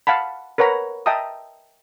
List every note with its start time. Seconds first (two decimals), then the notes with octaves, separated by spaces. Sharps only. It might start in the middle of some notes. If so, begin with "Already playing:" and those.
0.07 F5 F#5 A5 B5
0.58 A#4 B4 C#5 F#5 A#5 B5
1.06 D#5 E5 G5 A5 A#5 D#6